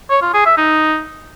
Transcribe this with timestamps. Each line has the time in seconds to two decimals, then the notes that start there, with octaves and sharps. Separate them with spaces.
0.10 C#5
0.22 F4
0.34 G#4
0.46 E5
0.58 D#4